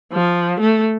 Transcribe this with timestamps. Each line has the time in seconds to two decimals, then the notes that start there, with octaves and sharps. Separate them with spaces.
0.13 F3
0.60 A3